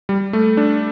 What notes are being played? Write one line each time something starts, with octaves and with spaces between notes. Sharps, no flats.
G3
A3
D4